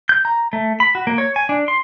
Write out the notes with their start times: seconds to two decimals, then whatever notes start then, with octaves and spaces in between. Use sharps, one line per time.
0.09 G6
0.25 A#5
0.53 A3
0.80 B5
0.95 F#4
1.07 A#3
1.18 C#5
1.36 G#5
1.49 D4
1.68 C6